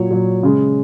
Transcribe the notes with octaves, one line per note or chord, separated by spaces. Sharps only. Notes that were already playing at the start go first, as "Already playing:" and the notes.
Already playing: A#2 F#3 C#5
A#2 F#3
C#3 G#3